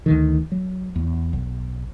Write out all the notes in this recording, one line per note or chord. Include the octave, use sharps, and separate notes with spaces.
D2 D3 D#3
F#3
E2
B1